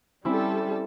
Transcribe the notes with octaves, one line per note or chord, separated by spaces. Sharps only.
G3 C4 C#4 E4 A4